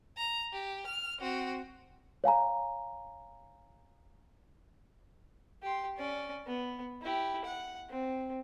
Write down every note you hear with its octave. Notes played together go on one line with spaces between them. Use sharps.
A#5
G4
F6
C4 F#4
C#5 F5 G#5 A#5
G4 C6
C#4 D5
B3
E4 G4
F#5
C4